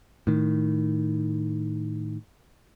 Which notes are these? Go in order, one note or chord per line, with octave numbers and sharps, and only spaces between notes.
A2 D#3